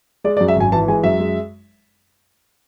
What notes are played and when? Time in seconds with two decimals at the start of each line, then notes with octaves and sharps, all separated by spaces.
0.24 G#3 D5
0.37 D5
0.41 F#2
0.48 E5
0.56 G#1 G#5
0.72 E3 A5
0.88 G#3 G#5
1.04 F#2 E5
1.20 G#3